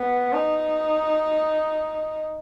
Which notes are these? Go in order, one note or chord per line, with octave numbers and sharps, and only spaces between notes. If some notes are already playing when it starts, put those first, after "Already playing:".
Already playing: B3
D#4